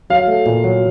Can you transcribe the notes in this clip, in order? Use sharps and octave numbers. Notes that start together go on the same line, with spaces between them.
F#3 F5
A3
A#2
F#3